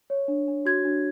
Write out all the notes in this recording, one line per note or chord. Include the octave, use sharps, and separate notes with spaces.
C#5
D4
D4
F#4 G#6
D4